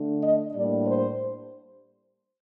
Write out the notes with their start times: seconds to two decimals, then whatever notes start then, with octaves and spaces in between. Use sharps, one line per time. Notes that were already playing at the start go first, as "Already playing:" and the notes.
Already playing: D3 A3 D4
0.21 D#5
0.54 A2 G3 A#3 D4 D5
0.87 C5